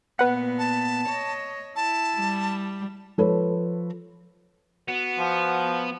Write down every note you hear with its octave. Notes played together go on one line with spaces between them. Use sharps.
A#2 B3 B4 F#5
A5
C#5 D#5
E4 A5
G3
F3 A4 B4 C#5
B3 F#4
F3